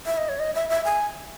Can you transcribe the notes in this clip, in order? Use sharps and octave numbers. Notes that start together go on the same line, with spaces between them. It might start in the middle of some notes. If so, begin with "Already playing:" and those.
E5
D#5
C#5
D#5
E5
E5
G#5